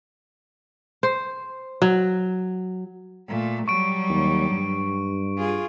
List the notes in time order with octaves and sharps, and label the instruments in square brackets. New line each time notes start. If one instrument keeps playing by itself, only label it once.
[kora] C5
F#3
[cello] A#2 A3
[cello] F#3 G3 [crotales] C#6 D7
[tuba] D#2
G2
[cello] F4 G#4